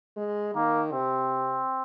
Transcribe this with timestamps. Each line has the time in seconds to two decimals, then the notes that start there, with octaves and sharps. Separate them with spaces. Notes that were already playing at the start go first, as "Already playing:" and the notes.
0.17 G#3
0.55 D#3 A#3
0.92 C3 C4